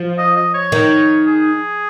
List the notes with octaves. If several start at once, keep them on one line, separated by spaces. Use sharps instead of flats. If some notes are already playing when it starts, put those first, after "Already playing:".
Already playing: F3
D#5
D#5
C#5
D#3
G#4